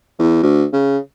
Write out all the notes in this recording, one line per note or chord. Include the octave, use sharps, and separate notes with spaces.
E2
D2
C#3